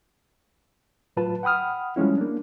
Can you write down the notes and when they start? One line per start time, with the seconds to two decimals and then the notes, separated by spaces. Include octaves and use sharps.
1.17 A2 F#3 F4 B4 A5
1.43 F#5 G5 B5 D#6 F6
1.96 F3 G3 G#3 C#4 E4
2.17 A#3 D4